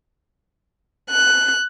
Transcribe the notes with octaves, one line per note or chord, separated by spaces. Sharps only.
F#6